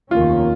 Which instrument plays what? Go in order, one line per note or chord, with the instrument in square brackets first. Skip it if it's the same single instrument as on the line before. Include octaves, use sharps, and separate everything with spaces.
[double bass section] F1 D#2 D#3 A#3 C#4 [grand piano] F4